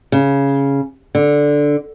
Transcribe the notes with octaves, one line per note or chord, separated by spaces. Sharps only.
C#3
D3